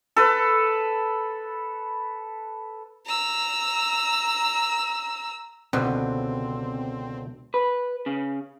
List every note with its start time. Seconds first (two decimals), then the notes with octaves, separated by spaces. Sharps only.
0.16 A4 B4
3.06 A#5 E6
5.73 C#2 B2 D3 C4 C5
7.54 B4
8.06 C#3